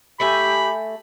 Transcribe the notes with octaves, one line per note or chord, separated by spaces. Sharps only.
A3 G4 E5 G#5 B5